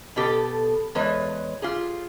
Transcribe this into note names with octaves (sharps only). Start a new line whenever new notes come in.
B2 B3 G4 A4
E2 G#3 B4 C#5
F4 G4 G#4